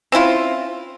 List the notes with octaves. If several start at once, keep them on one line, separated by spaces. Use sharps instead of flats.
C4 C#4 E4 F4